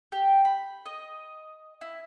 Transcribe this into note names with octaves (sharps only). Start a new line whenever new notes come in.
G4
B5
D#5
E4